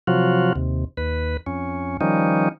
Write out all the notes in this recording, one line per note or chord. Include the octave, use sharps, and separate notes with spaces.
C3 F3 F#3 F4 F#4
D#2 C3
D#2 B4
F2 C#4
D#3 F3 G3 C#4 D#4